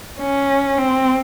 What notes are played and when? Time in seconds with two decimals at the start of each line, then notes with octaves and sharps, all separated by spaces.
0.20 C#4
0.78 C4